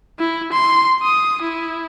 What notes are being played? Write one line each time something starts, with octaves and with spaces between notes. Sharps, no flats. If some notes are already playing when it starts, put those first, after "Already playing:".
E4
C6
D#6
E4